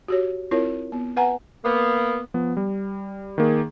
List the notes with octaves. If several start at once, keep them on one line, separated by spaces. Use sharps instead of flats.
F#4 G4 C#5
C4 E4 F4 A#4 C#5
B3
B4 F#5 G#5 A#5
A#3 B3
F3 B3
G3
D#3 A#3 G#4